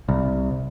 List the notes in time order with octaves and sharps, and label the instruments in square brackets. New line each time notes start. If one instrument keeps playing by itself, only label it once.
[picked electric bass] C2